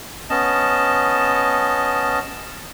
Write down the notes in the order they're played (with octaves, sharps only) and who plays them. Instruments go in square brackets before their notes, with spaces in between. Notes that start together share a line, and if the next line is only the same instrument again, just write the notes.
[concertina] B3 C#4 D#5 A5